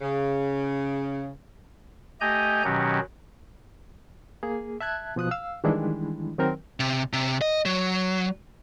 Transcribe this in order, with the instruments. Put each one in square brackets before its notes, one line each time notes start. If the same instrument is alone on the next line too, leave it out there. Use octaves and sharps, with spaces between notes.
[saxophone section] C#3
[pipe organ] A3 G4 D#5 G#5 A#5 G6
B2 D#3 F#3 C#4 F#4 G4
[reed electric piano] A#3 G#4
E5 A5 F#6 G#6
B2 F3 D#6 F#6
F5 E6
D#3 E3 G3 G#3 D4 E4
D#3 F#3 C4 A#4
[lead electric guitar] C3
C3
D#5
F#3